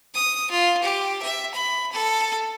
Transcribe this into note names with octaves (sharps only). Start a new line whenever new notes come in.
D#6
F4
G4
E5
B5
A4